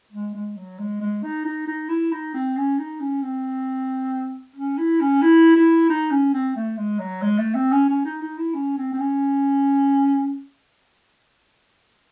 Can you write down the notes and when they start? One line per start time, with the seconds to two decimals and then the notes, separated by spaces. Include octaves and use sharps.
0.12 G#3
0.35 G#3
0.57 F#3
0.79 G#3
1.01 G#3
1.24 D#4
1.45 D#4
1.68 D#4
1.89 E4
2.12 D#4
2.34 C4
2.57 C#4
2.79 D#4
3.00 C#4
3.22 C4
4.56 C#4
4.78 E4
5.01 C#4
5.22 E4
5.56 E4
5.90 D#4
6.11 C#4
6.34 C4
6.56 A3
6.78 G#3
6.99 F#3
7.22 G#3
7.38 A3
7.55 C4
7.72 C#4
7.89 C#4
8.05 D#4
8.22 D#4
8.38 E4
8.55 C#4
8.78 C4
8.93 C4
8.99 C#4